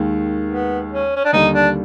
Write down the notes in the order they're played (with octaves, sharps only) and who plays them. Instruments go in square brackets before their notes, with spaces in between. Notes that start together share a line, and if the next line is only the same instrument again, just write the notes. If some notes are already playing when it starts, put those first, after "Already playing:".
Already playing: [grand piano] D#2 D#3 G#3
[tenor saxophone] B3
C#4
C#4
D4
[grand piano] D#2 D3 G3 [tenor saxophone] D#4
[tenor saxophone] D4